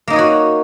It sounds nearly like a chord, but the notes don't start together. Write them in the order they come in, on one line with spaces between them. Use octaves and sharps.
A#3 D#4 D#5 C#5 F#4